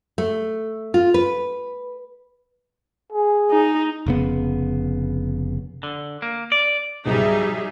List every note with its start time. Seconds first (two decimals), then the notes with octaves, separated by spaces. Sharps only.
0.18 A3
0.94 F4
1.14 B4
3.12 G#4
3.50 D#4
4.06 F1 C#3 B3
5.83 D3
6.22 A#3
6.52 D5
7.06 C#2 G#2 B2 F#3 G3 D#4 G#4 E5